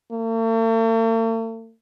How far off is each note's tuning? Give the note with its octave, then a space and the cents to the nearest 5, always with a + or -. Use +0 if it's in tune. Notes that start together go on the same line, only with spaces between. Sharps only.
A3 +45